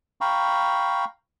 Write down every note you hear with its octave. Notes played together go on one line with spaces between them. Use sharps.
F5 G5 A#5 B5 C#6